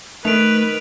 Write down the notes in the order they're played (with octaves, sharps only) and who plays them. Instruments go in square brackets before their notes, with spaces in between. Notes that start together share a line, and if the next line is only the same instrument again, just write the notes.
[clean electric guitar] D#3 [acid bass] A3 [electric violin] B4 [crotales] D7 F7